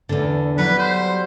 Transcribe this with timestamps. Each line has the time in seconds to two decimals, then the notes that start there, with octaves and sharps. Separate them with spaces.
0.09 E2 D3
0.58 F#3 G3 B4
0.79 C5